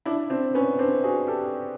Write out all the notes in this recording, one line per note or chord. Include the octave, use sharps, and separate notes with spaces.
D4 E4
C4 D4
B3 C#4
C4 D4
F#4 G#4
G4 A4